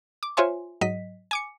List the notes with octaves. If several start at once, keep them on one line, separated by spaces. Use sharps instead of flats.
D6
F4 C5 C#5 E5 G#5 C6
G#2 F#3 D#5 B6
G#5 D6 C#7